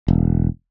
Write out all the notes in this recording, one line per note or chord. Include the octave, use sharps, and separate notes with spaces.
E1